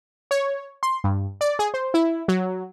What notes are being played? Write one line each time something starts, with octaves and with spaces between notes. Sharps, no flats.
C#5
C6
G2
D5
G#4
C5
E4
F#3